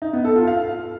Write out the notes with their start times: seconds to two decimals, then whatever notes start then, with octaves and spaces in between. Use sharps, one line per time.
0.02 D#4
0.13 B3
0.25 A4
0.36 F4
0.47 F5